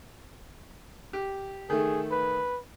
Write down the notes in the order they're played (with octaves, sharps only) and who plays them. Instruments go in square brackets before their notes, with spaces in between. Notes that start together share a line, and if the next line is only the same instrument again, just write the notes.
[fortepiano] G4
[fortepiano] D#3 A3 [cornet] G#4
[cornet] B4